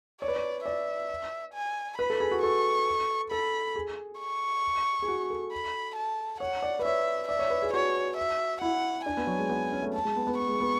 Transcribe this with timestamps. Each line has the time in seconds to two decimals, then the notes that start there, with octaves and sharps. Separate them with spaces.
0.21 C#5 D5
0.28 B4
0.36 C#5
0.65 D5 E5
1.54 G#5
1.98 B4 B5
2.10 A4
2.20 G#4
2.31 F#4
2.42 A4 C#6
3.31 A4 B5
3.76 G#4
4.20 C#6
5.02 G#4
5.08 F#4
5.30 A4
5.52 B5
5.96 A5
6.40 C#5 F#5
6.62 D5
6.79 B4
6.84 C#5 E5
7.28 D5 E5
7.39 C#5
7.50 B4
7.62 G#4
7.73 F#4 C#5
8.17 E5
8.62 E4 F#5
9.05 D4 G#5
9.17 B3
9.27 F#3
9.39 G#3
9.50 B3
9.72 C#4
9.82 A3
9.94 A5
10.05 G#3
10.16 B3
10.27 B3
10.38 C#6
10.49 G#3
10.60 B3